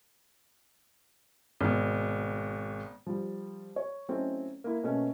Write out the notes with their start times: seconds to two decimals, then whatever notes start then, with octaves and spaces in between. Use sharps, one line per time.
1.61 G#1 B2
3.06 F3 G3
3.76 C#5
4.08 F#3 A3 C4 C#4 D#4 E4
4.64 A#3 E4
4.84 B2 A3 A#3 C#4